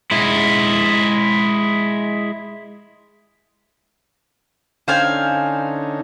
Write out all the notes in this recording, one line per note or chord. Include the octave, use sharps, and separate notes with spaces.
G#3 E4
D3 C#4 D#4 C5 F5 G#5